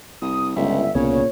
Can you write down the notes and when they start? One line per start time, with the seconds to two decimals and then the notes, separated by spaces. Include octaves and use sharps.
0.21 C2 D#6
0.56 G1 C#2 E5
0.95 C2 A#2 C#3 B3 C#5